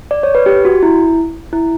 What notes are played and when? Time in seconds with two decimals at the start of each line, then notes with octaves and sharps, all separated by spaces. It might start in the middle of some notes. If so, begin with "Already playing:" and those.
0.11 D5
0.23 C#5
0.35 B4
0.46 G4
0.65 F#4
0.83 E4
1.53 E4